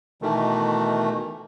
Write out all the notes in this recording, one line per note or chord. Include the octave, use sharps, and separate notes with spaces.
B2 D#3 E3 A3